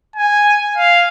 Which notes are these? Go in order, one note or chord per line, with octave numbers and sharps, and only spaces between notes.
G#5
F5